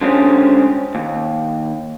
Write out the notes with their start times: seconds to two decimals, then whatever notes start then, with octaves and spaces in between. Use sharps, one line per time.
0.01 D3 G3 G#3 C4 C#4 G#4
0.95 D#2